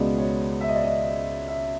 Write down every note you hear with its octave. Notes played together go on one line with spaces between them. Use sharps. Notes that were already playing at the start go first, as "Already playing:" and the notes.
Already playing: C#2 B2 G#3 B3 D5
C#5
E5
D#5
D5
D#5
E5